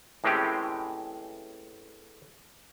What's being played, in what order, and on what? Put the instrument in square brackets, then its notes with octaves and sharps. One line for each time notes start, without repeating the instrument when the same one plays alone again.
[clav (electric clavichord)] A2 E3 G#3 C4 C#4 G4